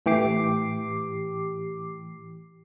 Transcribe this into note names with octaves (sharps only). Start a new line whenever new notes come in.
A2 E3 G4 D6 C7